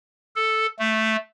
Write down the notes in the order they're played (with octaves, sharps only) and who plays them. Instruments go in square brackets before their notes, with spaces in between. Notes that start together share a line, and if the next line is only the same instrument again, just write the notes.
[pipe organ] A4
A3